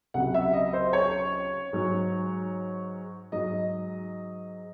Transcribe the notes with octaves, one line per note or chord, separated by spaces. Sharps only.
C#2 C3 F#3 F#5
E5
D#5
C5
C#5
G#2 F#3
G#2 F#3 D#5